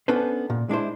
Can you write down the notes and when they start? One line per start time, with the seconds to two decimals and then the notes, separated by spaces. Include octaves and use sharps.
0.08 B3 C#4 D4 A4 B4 C5
0.50 A#2
0.69 G#3 D4 E4 C5